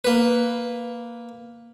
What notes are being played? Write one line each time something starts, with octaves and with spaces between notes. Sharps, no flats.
A#3 B4